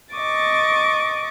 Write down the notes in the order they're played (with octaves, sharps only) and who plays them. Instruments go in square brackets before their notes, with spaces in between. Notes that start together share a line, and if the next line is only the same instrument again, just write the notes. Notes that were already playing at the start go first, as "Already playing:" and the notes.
[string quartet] D#5 C#6 D6 A6